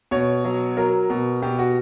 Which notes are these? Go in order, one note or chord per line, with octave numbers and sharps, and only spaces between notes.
B2 C#5
F#3
F#3 A#4
B2
B2 G4
F#4